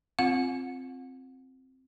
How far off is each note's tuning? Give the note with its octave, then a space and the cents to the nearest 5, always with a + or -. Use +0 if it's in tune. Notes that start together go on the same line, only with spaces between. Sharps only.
C4 +0 F4 +0 F#5 -30